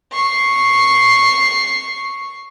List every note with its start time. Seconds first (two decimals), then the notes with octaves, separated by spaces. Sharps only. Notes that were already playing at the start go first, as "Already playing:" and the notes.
0.13 C#6 C7